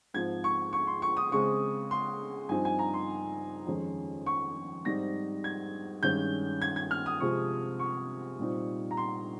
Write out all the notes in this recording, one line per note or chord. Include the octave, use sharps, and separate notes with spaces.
G#2 F3 C4 G#6
C#6
C#6
C6
C#6
D#6
C#3 G#3 C4 C#6
C6
G2 F3 C4 D#4 G#5
G#5
A#5
C6
F2 D#3 G#3 C#4
C#6
G#2 G3 C4 D#4 A#6
G#6
G2 D#3 G#3 C#4 G6
G#6
G#6
F6
D#6
C3 F3 G#3 C#6
C#6
A#2 G3 C4 D#4
A#5
C6